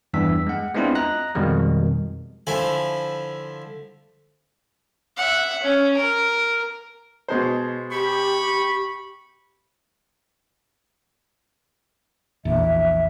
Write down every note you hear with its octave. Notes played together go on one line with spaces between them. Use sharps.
E2 G2 E3 E6 B6
G#3 F#5
G#3 B3 C4 D4 E4 F4
D#5 A#5 F#6 A#6
F2 B2 D#3 G3 G#3
D3 F3 E4 G#5
E5 F#5
C#4
A#4
B2 G#3 C5
G4 B5 C#6
A#1 E2 E5